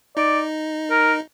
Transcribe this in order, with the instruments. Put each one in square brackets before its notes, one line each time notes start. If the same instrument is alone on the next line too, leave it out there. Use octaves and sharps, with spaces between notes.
[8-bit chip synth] D#4 [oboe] D5
[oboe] A#4